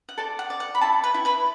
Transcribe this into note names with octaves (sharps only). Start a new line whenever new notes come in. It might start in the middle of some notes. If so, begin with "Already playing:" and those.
F#5
A4 D5 A5
F#5
D5
F#5
B5
E4 A4 A5
B4 B5
E4
B4 B5